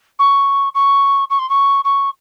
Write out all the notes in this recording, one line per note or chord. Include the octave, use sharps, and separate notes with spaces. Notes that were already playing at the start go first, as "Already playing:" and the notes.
C#6
C#6
C#6
C6
C#6
C#6